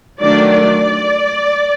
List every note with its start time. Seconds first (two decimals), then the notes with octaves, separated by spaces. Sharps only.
0.20 D#3 F#3 A3 D4 D5
0.52 D5